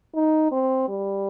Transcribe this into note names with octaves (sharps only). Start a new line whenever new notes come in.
D#4
C4
G3